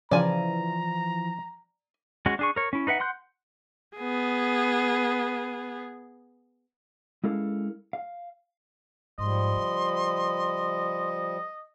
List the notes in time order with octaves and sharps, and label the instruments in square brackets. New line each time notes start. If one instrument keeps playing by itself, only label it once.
[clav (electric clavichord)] C#3 F4 [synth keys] E3 F3 [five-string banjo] D5 G#5 [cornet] A#5
[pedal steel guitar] G#3 C#4 F#4
D4 G#4 C#6
A#4 C#5
C#4 E4
D#4 B4 E5 F#5
F#5 C6 F#6 G6
[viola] B3 G#4
[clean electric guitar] G#3 C#4 E4 A4 A#4 F5
F5
[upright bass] G#2 [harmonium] F3 G3 [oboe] D#5 [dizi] C6
[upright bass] C#3